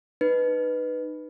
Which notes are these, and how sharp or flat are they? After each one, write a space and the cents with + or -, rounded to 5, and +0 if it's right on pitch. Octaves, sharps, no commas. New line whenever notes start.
D#4 -25 B4 +0